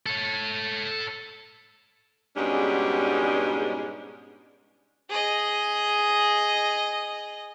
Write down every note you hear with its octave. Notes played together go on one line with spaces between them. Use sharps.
A4 C#5
G#2 B2 G3 G#3 C#4 D4
G#4 D#5